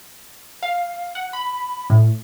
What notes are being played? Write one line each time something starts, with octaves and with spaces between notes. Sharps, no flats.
F5
F#5
B5
A2